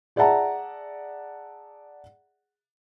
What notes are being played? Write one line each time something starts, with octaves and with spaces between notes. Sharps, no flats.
G#4 D5 E5 F#5 A5 A#5